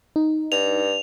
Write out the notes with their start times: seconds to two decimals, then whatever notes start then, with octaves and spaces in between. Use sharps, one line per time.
0.16 D#4
0.52 G2 F7